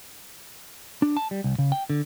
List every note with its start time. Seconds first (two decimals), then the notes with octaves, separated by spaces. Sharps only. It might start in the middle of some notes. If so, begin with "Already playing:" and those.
1.02 D4
1.17 A5
1.31 G3
1.44 C2
1.59 C#3
1.72 G5
1.90 D3